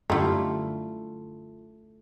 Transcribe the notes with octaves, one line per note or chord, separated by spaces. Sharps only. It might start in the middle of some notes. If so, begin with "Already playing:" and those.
F#2 D3 G3 A3 E4 F4 A#4